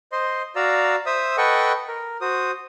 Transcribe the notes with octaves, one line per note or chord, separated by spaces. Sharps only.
C5 D#5 C6
F#4 D5 F5 A#5 E6
C5 E5 D#6 E6
A4 B4 D#5 F#5 G5 C#6
A#4
F#4 C5 D#6